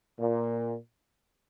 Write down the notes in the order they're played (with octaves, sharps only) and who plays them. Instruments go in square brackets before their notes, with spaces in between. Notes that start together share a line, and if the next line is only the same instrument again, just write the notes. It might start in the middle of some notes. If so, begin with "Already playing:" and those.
[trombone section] A#2